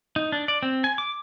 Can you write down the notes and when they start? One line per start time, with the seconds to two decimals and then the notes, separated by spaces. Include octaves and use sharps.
0.16 D#4
0.32 D4
0.48 D5
0.63 C4
0.84 G#5
0.98 D6